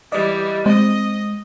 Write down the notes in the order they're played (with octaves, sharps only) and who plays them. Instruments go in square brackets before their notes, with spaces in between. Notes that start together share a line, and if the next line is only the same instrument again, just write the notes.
[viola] E3 G3 [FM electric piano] D5 D#5
[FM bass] G#3 [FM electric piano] C4 [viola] D#5